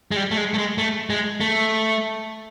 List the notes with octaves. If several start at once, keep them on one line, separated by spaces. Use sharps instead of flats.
G#3
G3
A3
G#3
A3
G#3
A3
G#3
A3